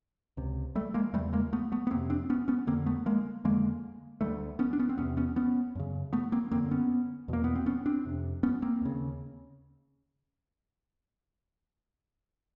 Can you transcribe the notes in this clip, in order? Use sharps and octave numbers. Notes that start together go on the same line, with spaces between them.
C#2 C3
G3 A3
G#3 A#3
E2 C#3 G3 A3
G#3 A#3
A3 B3
A3 B3
B3
F2 C3 A#3 C4
C4 D4
B3 C#4
B3 C#4
F2 D3 A#3 C4
A3 B3
G#3 A#3
F2 D3 G#3 A#3
D2 D3 G3 A3
B3 C#4
D4
B3 C#4
C4
E2 C3 B3 C#4
B3 C#4
B3 C#4
F#2 C#3
A3 B3
A#3 C4
F#2 D3 A#3 C4
B3 C#4
E2 B2 A#3
B3
C4
B3 C#4
C4 D4
F2 C3
B3 C#4
A#3 C4
D#2 C#3